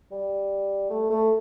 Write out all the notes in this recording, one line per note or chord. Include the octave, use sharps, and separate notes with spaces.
G3
A3
A3